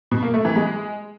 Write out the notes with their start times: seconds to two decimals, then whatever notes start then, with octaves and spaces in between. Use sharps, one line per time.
0.11 B2
0.23 A#3
0.34 A3
0.45 E3
0.56 G#3